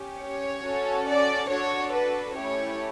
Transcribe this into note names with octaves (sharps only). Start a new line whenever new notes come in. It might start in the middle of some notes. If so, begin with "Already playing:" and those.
Already playing: C#4 G4
C#5
C#4 F#4 A4
D5
D4 F#4 A4 C#5
B4
A3 C#4 E4 G4 C#5